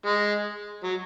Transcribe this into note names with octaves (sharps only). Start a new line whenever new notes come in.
G#3
F#3